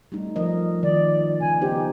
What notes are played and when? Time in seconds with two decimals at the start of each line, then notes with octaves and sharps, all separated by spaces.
0.12 G3 A3 D#4
0.36 F3 A#4 D#5
0.83 D#3 F4 D5
1.41 C#3 G#5
1.61 B3 D#4 G4 C5